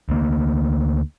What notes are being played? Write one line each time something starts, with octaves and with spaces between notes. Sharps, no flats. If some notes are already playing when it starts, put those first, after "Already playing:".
D2 A#3